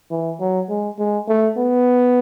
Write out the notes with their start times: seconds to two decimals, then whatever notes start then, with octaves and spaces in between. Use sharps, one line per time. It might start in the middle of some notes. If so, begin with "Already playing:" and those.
0.11 E3
0.40 F#3
0.70 G#3
0.99 G#3
1.28 A3
1.58 B3